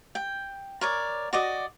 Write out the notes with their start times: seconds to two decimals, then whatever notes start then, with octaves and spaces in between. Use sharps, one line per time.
0.15 G5
0.81 A#4 C#5 D5
1.33 F#4 D5 D#5